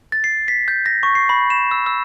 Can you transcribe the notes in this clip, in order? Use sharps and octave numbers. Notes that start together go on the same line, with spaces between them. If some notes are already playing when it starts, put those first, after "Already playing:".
A6
C7
B6
G6
A#6
C#6
C7
B5
E7
E6
E6